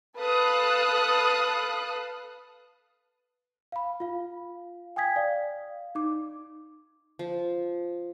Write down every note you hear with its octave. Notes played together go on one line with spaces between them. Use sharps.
A4 B4 F5 A5 D#6 F#6
F5 B5
F4 F5
G5 G#5 D#6 G#6 B6
D5 F5
D#4 D6
F3